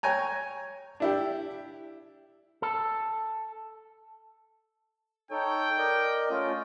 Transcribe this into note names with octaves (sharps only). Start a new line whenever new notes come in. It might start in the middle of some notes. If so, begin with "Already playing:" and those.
C#5 G5 G#5 A#5
D4 E4 G4
A4
D#4 A4 C#5 G5
A#4 D5 D#5
A3 C#4 F4